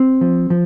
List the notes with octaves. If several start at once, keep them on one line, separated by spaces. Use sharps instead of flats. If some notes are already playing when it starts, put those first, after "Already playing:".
Already playing: C4
F3
F3